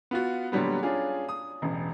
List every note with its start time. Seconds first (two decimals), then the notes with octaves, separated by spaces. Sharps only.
0.11 B3 F4 F#4
0.52 A#2 D3 F#3 G3 B3
0.83 C#4 D4 F4 G#4
1.29 D#6
1.62 E1 A1